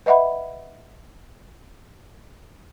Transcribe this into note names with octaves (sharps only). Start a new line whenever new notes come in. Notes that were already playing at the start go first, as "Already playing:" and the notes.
B4 D#5 E5 F#5 B5